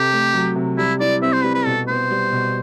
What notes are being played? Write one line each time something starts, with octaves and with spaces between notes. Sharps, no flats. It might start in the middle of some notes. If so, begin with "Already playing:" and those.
Already playing: C3 G4 A4
A3
F#3
C3
G3 E4
E4 D5
C4 E5
C5
G3 B4
B4
B2 A4
B3 C5
G3
B2